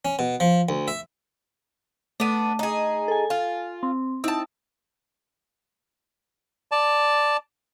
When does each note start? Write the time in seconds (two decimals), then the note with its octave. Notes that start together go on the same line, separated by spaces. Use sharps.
0.05 C#4
0.19 B2
0.40 F3
0.69 D2
0.88 E5
2.20 A3 B3 D4 D#7
2.59 D#4 G#4
3.08 A4 G#5
3.30 F4
3.83 C4
4.24 C4 D#4 E4 A5
6.72 D5 A5